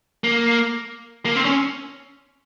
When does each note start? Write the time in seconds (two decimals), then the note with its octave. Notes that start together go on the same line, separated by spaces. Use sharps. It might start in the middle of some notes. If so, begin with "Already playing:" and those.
0.24 A#3
1.25 A#3
1.36 C4
1.45 C#4